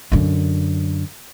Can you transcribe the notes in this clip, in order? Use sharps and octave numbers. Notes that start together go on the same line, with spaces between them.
F#2 D3